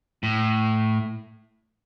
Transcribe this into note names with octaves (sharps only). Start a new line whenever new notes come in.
A2